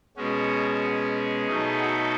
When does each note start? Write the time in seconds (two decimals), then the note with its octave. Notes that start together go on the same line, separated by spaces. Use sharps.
0.17 B2 G#3 C#4 F#4
0.83 G#4
1.48 B2 F#3 A3 D#4
1.81 F#4 A4